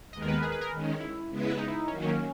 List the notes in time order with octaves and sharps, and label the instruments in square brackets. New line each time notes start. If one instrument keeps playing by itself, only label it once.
[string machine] D#2 D#3 G#3 B3 [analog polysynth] D#5
[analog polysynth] A#4
B4
G#4
B4
A#4
[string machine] D#3 G#3 C#4
[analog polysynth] E4
[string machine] C#3 G#3 B3 E4 B4
[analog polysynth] D#4
E4
[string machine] D#3 F#3 A#3 [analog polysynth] C#4
[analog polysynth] C#4